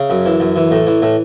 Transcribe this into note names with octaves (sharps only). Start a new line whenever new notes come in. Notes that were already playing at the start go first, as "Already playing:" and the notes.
Already playing: C#3 E5
F#2
E3
F#2
E3
A2
E3
A2